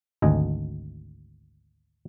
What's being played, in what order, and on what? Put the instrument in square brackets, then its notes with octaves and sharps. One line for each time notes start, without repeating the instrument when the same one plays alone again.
[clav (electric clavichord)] G#1 D2 D#5 G#5